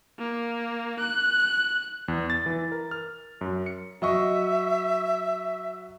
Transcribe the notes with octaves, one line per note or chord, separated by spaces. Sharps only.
A#3
F#6
E2
A6
E3
A#4
F6
F#2
C#7
F#3 D#5 E5 C#6